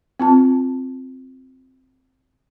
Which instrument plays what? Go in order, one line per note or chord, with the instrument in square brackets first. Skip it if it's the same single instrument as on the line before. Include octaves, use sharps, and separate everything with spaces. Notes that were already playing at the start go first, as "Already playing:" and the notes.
[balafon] C4 F4 A5